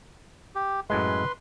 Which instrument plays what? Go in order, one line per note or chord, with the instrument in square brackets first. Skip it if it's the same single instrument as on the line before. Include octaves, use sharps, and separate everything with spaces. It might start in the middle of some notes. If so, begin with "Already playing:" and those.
[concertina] G4
[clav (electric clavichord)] F#2 A2 G#3 [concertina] B4 C6